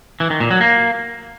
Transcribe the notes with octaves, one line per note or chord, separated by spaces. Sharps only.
E3
D#3
A#2
F#3
A#3